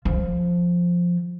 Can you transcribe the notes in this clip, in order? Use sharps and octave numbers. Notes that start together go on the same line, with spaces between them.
F3